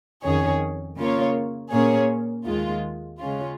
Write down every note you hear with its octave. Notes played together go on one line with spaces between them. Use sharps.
F2 D#3 C#4 G#4 C#5
C#3 A#3 F4 C#5
A#2 A#3 C#4 G#4 C#5
D#2 D#3 G#3 F4
C#3 G#3 C#4 F4